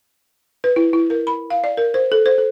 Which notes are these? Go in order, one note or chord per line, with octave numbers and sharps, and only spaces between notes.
B4
E4
E4
A#4
B5
F5
D5
A#4
C5
A4
C5
A4